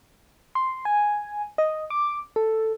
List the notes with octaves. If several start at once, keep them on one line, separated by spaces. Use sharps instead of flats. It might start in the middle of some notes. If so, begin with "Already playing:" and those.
C6
G#5
D#5
D6
A4